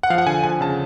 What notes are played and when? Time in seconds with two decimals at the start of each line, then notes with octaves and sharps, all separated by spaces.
0.03 F#5
0.10 F3 F5
0.18 F#5
0.26 D3 G#5
0.44 F3 G#5
0.61 C#3 A5